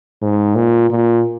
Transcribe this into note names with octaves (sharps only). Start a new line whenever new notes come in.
G#2
A#2
A#2